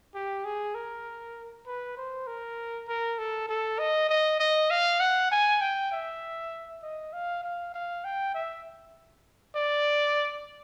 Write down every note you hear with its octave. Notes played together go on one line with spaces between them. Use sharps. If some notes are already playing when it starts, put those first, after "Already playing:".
G4
G#4
A#4
B4
C5
A#4
A#4
A4
A4
D#5
D#5
D#5
F5
F#5
G#5
G5
E5
D#5
F5
F5
F5
G5
E5
D5